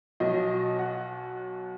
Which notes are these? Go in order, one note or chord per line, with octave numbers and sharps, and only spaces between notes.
B1 B2 F#3 D#5
F#5